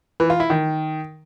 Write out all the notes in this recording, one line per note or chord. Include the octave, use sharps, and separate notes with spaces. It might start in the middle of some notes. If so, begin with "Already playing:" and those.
E3
F4
E4
D#3